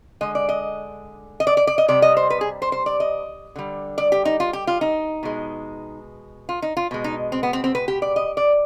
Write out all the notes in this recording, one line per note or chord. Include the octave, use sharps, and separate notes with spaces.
D3 G#3 D#5
D5
D#5
D#5
D5
D5
D5
D#5
C3 G3 D5
D#5
C5
B4
G#4
C5
C5
D5
D#5
D3 G3
D5
G4
D#4
F4
G4
F4
D#4
B2 G#3
F4
D#4
F4
B2 G#3
D#4
C4
B3
C4
C4
B4
G4
D5
D#5
D5